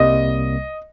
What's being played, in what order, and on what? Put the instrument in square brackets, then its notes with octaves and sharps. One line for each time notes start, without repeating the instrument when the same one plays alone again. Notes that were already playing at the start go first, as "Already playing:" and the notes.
Already playing: [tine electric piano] C2 C3 G3 A#3 [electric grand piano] D#5